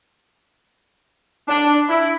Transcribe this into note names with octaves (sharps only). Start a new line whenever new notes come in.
D4
E4